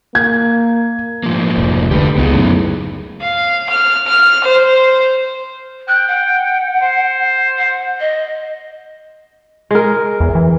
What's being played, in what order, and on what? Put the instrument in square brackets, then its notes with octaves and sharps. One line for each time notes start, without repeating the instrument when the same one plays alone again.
[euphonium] A#3 [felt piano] G#6
[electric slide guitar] G#2 F3 A#3
[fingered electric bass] F1
[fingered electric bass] D2 [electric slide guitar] G4 B4
[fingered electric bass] C#2 [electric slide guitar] B3 D#4 G#4
[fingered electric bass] F#2 A2
[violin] F5
F6
F6
C5
[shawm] G5 [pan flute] F#6
[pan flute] F#5
[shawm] C5
[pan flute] F#5
D#5
[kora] G#3 A#4
[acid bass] E2
E3